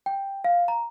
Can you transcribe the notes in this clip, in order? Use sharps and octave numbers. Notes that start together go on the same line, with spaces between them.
G5
F5
A#5